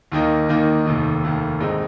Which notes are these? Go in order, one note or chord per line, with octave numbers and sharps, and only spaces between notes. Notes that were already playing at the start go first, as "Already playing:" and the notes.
D#2 D#3 A#3 D#4
D#2 D#3 A#3 D#4
F1 D#2 D#3
F1 D#2 D#3
A#1 G#2 G#3 C4 D#4